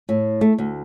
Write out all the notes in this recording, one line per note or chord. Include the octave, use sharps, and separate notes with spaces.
A2
A3
D2